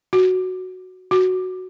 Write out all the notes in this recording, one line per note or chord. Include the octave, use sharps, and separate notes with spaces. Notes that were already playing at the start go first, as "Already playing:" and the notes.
F#4
F#4